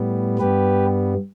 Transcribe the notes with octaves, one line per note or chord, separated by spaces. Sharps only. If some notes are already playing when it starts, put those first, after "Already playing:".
Already playing: A2 G3 B3
G2 G3 B3 G4 B4